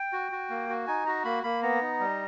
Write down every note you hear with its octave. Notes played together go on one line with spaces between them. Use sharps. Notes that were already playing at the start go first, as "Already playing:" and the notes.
Already playing: G5
F#4
F#4
A#3
F#4
D#4 G#5
F#4 A#5
A#3 B5
A#3 B5
B3 A#5
D#4
G3